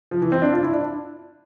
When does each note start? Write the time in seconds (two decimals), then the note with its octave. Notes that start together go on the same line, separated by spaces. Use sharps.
0.11 F3
0.22 E3
0.32 C4
0.42 D4
0.52 F4
0.63 E4
0.73 D4